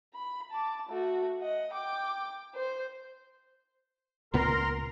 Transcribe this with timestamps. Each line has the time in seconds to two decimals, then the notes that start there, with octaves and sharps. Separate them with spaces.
0.14 B5
0.51 A5 D6
0.89 A3 F#4
1.40 D#5 F#5
1.72 G5 D6
2.55 C5
4.34 C#2 A#2 B3 A#4 A#5 C6